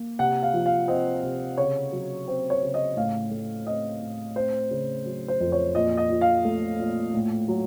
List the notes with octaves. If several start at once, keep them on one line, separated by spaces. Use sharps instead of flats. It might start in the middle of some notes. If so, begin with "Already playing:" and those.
Already playing: A#3
C3 F#5
F5
F3
F5
C4 D#5
C3
C#3 C#5
F#3
C4 C5
C#5
C#3
D#5
A2 F5
A3
C4 D#5
A2
C4 C5
C#3
F#3
C5
F2
C#5
A#2 D#5
D#5
F3
F5
A3
A#2
A2
F#3